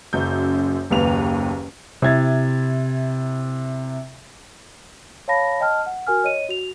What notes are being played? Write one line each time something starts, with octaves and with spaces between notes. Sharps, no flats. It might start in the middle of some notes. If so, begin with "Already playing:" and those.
F#1 F#2 G6
F#1 D#2 B4 F7
C3 E4 G#6 A6
C#5 F5 A5 B5 A#6
D#5 G5 A5 F6
F#5
F#4 A#4 G#5 F6
C#5 D#5 D#7
F#4 F7